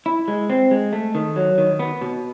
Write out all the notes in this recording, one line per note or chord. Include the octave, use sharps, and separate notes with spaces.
E4
G#3
C4
G#3
A3
D#3
F#3
D#3
B3
B2